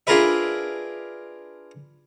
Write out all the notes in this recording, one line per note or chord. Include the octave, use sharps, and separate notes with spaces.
D4 F4 G#4 A#4 B4 E5